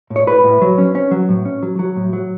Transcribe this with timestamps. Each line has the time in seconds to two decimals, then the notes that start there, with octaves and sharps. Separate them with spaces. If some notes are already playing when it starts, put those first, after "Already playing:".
0.10 A2
0.16 C#5
0.27 A2 B4
0.44 A2
0.62 F#3
0.78 C#4
0.95 C#4
1.11 F#3
1.29 A2
1.45 C#4
1.63 F#3
1.79 F#3
1.96 A2
2.13 F#3